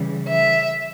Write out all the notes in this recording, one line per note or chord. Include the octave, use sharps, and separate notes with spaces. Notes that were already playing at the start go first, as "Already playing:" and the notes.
Already playing: C#3 E3 G3
E5